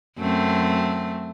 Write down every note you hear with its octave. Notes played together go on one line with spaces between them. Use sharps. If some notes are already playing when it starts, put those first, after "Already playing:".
F#2 A3 C4